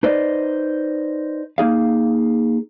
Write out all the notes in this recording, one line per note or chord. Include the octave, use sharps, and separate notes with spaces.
D#4 B4 C5 D5 D#5
A#3 D#4 G#4 F5